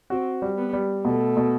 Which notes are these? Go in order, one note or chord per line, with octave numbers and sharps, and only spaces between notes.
C4 F#4
G3
B3
G3
B2 A3
B2